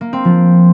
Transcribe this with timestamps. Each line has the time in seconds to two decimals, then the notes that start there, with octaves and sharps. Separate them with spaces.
0.01 A#3
0.13 C4
0.25 F3